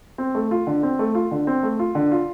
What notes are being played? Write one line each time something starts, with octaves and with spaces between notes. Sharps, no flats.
C4
A3
F4
D3
C4
A3
F4
D3
C4
A3
F4
D3
F4